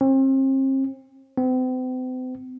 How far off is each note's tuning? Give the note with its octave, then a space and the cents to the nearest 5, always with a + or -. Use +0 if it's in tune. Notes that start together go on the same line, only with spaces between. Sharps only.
C4 +40
C4 -40